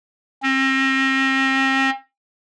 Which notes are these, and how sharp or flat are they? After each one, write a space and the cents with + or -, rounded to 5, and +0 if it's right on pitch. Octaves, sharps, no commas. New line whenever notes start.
C4 +40